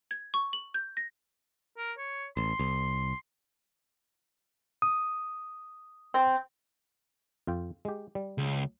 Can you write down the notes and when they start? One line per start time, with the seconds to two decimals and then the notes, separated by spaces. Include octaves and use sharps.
0.11 G#6
0.34 C#6
0.53 F#7
0.74 G6
0.97 A#6
1.78 A#4
1.98 C#5
2.37 A1 C6
2.59 C2
4.82 D#6
6.14 C4
7.47 F2 F4 G5
7.85 G#3 G4
8.15 G3
8.38 C#2